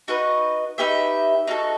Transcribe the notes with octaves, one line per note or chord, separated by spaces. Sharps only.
D#4 F#4 B4 D#5
D#4 G4 B4 E5
D#4 F#4 A4